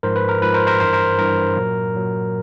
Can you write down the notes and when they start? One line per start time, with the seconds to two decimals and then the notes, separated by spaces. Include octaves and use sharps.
0.03 G#2 F3 A#4 C5
0.16 B4
0.29 A#4
0.42 G#2 F3 B4
0.54 A#4 C5
0.67 A#4 C5
0.80 G2 E3 A#4 C5
0.93 A#4 C5
1.19 G2 E3 A#4
1.57 A#2 F#3
1.94 A#2 F#3